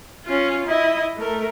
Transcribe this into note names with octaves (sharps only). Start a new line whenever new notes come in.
C#4 F4
E4 D#5
A3 A#4